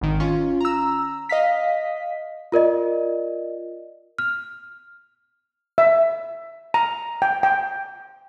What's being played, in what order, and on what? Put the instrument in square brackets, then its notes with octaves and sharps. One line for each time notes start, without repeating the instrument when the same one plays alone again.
[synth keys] G#1 D#3
C#4 F4
A#5 E6
D#5 F5 B6
[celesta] F4 A#4 D5 D#5
F6
[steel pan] E5
A#5
G5
G5